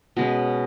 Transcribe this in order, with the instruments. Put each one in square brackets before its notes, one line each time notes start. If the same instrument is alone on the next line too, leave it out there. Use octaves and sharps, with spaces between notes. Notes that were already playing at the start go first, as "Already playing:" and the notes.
[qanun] B2 G#3 C#4